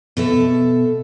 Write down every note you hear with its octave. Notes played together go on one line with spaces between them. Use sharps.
B2 A4 E5